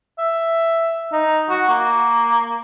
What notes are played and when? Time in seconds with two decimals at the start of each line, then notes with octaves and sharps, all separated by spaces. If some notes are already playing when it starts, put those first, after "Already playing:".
0.19 E5
1.12 D#4
1.50 F#4
1.69 A#3